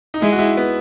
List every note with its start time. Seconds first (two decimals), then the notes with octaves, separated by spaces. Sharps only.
0.14 D#4
0.22 G#3 E4
0.33 F#4
0.39 E4
0.57 B3